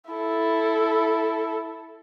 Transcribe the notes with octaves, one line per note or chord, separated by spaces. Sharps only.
E4 A4